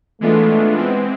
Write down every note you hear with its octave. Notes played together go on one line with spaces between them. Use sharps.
E3 G#3 A3 B3 D4 F4
E3 G#3 B3 C4